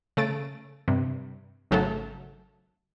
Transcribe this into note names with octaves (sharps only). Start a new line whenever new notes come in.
C#3 A3 A6 D7
G2 C3
G#1 C#3 F#3 A3 A4 A5